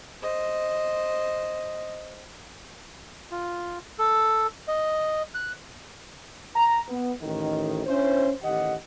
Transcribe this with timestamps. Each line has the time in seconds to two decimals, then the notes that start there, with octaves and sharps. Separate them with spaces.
0.22 C5 D#5
3.32 F4
3.99 A4
4.68 D#5
5.34 F#6
6.55 A#5
6.88 B3
7.22 A1 D#3
7.86 C#4 D4 E4 C5
8.43 A1 D#3 G4 D#5 F#5